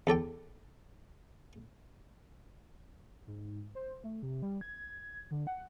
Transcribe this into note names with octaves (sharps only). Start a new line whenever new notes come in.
E2 A4 D5 G5
G#2
C5
A3
C3
G3
G#6
D3
F#5